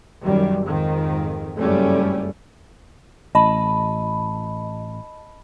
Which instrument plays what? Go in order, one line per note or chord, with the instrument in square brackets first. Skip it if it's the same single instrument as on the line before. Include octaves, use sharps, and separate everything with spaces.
[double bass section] F#2 D#3 G3
F2 G#2 D#3
F#1 G2 G3 A3 C#4
[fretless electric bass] A1 [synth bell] D#5 A5 B5